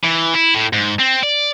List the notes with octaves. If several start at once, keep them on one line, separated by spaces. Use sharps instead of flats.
E3
E4
A2
G#2
C4
D5